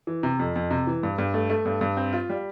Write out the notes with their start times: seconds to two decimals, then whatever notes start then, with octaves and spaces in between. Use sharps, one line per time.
0.07 E3
0.23 C3
0.39 F2
0.56 F2
0.71 C3
0.87 E3
1.03 G2
1.18 G2
1.34 A3
1.50 A3
1.65 G2
1.81 G2
1.97 C4
2.13 F4
2.30 G3